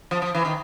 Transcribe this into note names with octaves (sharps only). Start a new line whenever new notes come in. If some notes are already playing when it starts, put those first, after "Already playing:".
F3
F3
E3
D#3